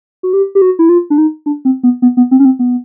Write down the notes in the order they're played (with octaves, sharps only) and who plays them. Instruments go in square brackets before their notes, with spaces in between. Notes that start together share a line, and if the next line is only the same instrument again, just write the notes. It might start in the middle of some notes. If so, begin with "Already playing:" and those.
[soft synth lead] F#4
G4
G4
F#4
E4
F4
D4
D#4
D4
C4
B3
B3
B3
C4
C#4
C4
B3